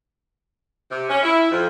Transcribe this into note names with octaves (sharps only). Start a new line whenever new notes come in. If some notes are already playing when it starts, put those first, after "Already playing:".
C3
C#4
E4
F2